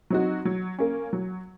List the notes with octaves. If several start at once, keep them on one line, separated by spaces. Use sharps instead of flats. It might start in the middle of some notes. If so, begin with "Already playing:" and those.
F#3 C4 D#4 F#4
F#3
A#3 C#4
F#3